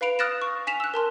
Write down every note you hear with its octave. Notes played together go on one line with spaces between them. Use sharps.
B4 F5 B5 D7 F7
D#6 F6 F#6 A6 A#6 E7
C#6
G#5 B6 E7 F7
E6 F#6
A#4 A5 C6